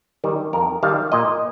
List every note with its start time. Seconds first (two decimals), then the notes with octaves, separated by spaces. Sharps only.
0.24 D#3 G3
0.53 F2 A#4
0.83 D#3 G3 F5
1.12 A#2 D#5